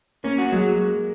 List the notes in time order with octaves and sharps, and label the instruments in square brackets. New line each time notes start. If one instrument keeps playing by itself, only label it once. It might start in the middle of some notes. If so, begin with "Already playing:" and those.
[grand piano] A#3 [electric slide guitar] C#4
[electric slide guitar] F#4
[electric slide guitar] F#3 [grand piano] G#3